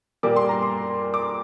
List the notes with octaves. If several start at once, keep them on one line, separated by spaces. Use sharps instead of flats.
A#2 G3 A#3 D6
C6
A#5
C6
D6